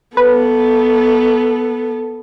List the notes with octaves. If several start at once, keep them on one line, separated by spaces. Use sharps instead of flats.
B3 A4 B4